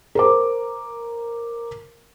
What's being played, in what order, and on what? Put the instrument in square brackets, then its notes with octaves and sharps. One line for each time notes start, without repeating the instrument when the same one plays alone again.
[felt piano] A#4 C5 D6